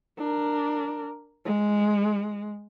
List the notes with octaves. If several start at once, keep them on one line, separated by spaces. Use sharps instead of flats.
D4 A#4
G#3